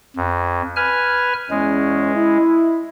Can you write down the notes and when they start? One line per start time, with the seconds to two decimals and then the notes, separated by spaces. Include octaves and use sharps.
0.16 F2
0.76 B4 G#5 F6
1.51 E2 G#3 C#4
2.15 E4